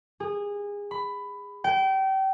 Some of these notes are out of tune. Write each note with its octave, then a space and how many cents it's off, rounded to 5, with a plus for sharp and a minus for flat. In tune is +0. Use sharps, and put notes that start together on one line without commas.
G#4 -25
B5 +15
G5 -30